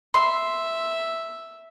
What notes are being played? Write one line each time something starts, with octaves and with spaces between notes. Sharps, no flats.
E5 C6